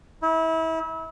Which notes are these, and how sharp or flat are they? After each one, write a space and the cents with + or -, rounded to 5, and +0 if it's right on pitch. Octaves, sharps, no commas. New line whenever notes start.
E4 -30